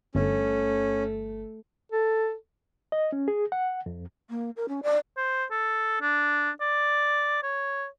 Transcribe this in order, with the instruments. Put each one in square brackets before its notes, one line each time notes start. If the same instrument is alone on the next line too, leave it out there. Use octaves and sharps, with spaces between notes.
[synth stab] G1 [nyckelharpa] A3 [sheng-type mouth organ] C#4
[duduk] A4
[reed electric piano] D#5
C#4
G#4
F#5
F2
[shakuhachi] A#3
A#4
C#4
D5
[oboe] C5
A4
D4
D5
C#5